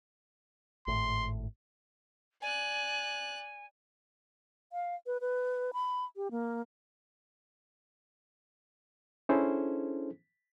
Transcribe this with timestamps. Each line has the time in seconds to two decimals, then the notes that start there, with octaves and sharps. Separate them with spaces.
0.87 G#1 A2 C6
2.42 D5 G#5 F#6
4.73 F5
5.07 B4
5.21 B4
5.73 B5
6.16 G4
6.31 A#3
9.29 C#4 D4 E4 G#4 A4 C5